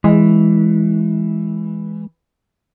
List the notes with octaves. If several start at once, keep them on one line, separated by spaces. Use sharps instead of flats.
E3 G#3